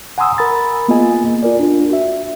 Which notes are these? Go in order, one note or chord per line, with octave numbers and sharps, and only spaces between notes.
F#5 G#5 A#5 C6 D#6 E6
A#4 A#5 B5 A6
A#3 B3 F4 G#4 D#5 G#5
F4 A#4 D5
D4 F4
F#4 E5